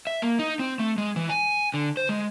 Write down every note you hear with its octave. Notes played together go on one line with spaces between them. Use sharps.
E5
A#3
D#4
C4
A3
G#3
E3
G#5
D3
C5
G#3